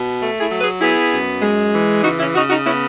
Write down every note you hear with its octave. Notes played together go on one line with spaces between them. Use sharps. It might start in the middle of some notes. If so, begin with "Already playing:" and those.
Already playing: B2
A3
E4 G#4
F#3
G#4 B4
B3 E4 G#4
F#2
G#3
E3
C#3 D#4 F#4
C#4 E4
C#3 D#4 F#4
D#4 F#4
B3 C#4 E4